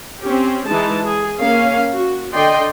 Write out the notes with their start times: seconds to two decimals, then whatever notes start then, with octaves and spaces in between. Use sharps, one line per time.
0.22 C4 C#4 G4
0.68 E3 G#3 D#4 A5
1.04 G#4
1.38 A#3 C#4 F5
1.97 F#4
2.34 D3 D5 D#5 G5 C6